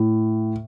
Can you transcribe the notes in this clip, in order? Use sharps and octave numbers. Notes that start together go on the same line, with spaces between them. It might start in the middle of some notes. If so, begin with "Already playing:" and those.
Already playing: A2